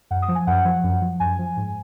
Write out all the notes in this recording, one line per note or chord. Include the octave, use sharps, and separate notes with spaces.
F#2 F#5
D#6
F3
G#5
F#2 F#5
F3
F#2
F3
F#2 G#5
F3
G#2